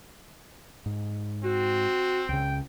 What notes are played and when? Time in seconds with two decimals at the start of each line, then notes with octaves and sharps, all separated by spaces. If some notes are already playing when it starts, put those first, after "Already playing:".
0.86 G#2
1.44 C4 F#4
2.29 C#2 C#3 G5